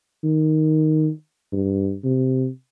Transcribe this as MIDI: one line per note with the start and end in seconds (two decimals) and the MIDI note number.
0.24 1.10 51
1.52 1.95 43
2.04 2.48 48